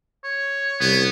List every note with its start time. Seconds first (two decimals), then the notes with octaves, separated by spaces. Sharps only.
0.24 C#5
0.81 C2 B3